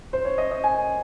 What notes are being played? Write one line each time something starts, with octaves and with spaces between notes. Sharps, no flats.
C5
C#5
D#5
D#5
G#5